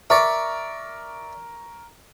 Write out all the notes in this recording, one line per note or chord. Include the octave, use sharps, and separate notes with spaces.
A#4 D5 E5 C#6